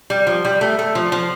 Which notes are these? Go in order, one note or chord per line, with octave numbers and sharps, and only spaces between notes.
G3
F3
G3
A3
A3
F3
F3